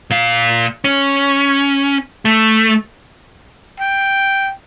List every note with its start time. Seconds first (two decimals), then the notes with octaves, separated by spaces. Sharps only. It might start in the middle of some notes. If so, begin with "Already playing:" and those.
0.10 A#2 F5
0.84 C#4
2.25 A3
3.80 G5